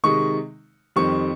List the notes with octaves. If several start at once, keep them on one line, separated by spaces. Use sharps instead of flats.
C3 D#3 G#3 D#4 C#6
F2 D#3 G3 C4 C#6